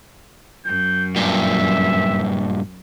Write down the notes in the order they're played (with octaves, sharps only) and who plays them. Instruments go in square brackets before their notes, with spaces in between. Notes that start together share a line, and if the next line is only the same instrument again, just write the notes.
[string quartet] F#2 [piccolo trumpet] G6
[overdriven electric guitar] G2 A#2 [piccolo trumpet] E5